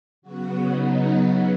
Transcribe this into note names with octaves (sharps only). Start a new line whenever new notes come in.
C#3 F#3 B3 F#4
D#4
F#4